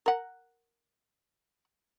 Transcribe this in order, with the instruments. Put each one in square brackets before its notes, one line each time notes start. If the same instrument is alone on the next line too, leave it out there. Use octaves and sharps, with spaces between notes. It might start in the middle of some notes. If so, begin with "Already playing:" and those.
[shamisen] A#4 F#5